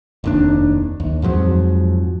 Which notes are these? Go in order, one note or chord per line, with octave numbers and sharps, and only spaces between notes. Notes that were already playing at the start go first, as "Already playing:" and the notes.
F1 D#2 D4
D#2
F2 G#2 F3 F#3